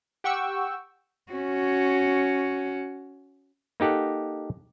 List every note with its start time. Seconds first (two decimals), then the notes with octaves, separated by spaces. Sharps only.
0.24 G4 F#5 G5 C#6 E6
1.32 C#4 F#4
3.80 A#3 D#4 G4 A4 F#5